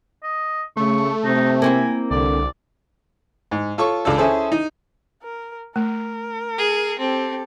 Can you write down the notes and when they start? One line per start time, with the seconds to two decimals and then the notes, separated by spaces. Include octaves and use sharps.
0.23 D#5
0.77 C#3 A3 C#6
1.25 C3 D#4
1.62 A#3 C4 E4 G#5
2.11 C2 D3 D5
3.51 G#2
3.78 F4 A4 C#5 C#6
4.05 C#2 D4 A4
4.18 C#4 E4 G#4 A4 C5
4.52 D#4
5.23 A#4
5.76 A3 A#4
6.58 G#4
6.99 C4 G4 A4